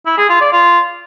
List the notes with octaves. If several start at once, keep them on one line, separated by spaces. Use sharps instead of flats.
E4
G#4
F4
D5
F4